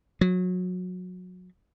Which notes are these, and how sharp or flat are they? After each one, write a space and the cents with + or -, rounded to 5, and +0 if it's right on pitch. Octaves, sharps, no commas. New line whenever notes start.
F#3 -25